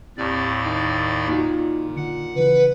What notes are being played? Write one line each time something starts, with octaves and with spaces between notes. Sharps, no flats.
D#2 A2 C3 D5
D#3
A#2 D#4 F4 F#4
D3 F#5
C#3 E3 B4